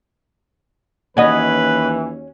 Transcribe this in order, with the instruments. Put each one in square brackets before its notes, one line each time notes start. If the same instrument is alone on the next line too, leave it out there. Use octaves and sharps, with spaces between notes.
[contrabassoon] D#2 [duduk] E3 [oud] C#4 F#4 D#5 [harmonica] B4